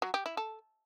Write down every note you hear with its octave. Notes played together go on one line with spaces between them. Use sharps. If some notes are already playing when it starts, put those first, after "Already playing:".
F#3
G4
E4
A4